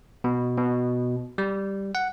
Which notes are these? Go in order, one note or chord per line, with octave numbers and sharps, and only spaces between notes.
B2
B2
G3
F#5